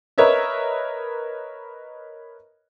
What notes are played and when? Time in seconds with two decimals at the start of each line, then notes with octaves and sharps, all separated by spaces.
0.18 A#4 B4 C#5 D#5 E5